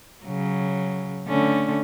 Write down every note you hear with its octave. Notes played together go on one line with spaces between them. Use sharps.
C#3 F#3
D3 A3 C#4